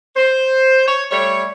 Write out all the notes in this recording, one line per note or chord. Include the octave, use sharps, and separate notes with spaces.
C5
C#5
G3 A3 C#5